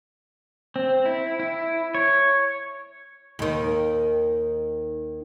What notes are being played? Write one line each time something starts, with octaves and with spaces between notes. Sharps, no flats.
C4
E4
E4
C#5
D#2 D#3